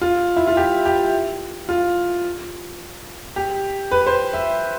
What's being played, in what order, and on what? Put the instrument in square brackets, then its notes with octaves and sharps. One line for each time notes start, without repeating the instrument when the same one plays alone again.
[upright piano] F4
E4
F4
G4
G4
F4
G4
B4
C5
E5